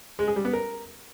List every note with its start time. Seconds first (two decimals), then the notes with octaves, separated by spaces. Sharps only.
0.19 G#3
0.28 G#4
0.36 G3
0.45 B3
0.53 A#4